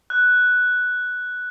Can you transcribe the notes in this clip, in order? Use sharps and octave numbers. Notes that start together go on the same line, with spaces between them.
F#6